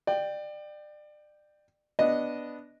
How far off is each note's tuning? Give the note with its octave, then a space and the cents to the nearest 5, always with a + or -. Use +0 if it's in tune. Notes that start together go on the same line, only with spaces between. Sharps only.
D5 +30 G5 +0
B3 +0 D4 +0 D#5 +0